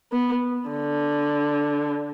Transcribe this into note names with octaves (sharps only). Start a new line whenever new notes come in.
B3
D3